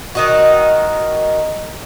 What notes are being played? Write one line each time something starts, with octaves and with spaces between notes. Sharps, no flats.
D#3 D#4 F#4